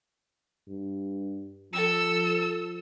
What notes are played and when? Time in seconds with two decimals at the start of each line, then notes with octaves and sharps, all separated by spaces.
0.68 G2
1.72 F3 A4 E6